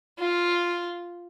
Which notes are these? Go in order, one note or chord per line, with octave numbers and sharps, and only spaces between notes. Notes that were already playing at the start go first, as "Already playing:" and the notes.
F4